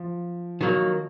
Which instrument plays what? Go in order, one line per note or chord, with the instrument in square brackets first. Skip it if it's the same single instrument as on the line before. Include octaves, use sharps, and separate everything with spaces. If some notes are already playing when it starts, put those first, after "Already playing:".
Already playing: [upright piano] F3
[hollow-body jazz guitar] D#3 F#3 A#3